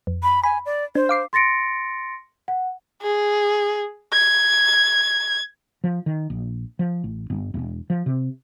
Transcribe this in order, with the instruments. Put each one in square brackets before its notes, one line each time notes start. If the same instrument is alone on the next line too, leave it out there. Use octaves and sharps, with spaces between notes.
[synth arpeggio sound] F2
[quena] B5
[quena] G#5 [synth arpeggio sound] B5
[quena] D5
[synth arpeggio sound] D4 [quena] C5
[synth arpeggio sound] F5 D6 C7
[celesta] C6 A6 A#6 C#7 D7
F#5
[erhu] G#4
G#6
[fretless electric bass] F3
D#3
A#1
F3
A1
G1
E1
F3
C3